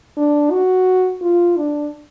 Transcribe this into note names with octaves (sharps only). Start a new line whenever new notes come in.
D4
F#4
F4
D4